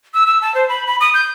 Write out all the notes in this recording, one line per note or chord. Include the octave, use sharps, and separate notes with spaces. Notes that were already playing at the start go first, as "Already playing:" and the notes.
E6
E6
A5
C5
B5
B5
D#6
G6